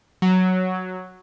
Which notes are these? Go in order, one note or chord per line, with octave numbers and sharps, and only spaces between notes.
F#3